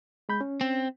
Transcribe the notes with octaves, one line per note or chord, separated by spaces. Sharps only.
G#3 B5 G6
C#4
C4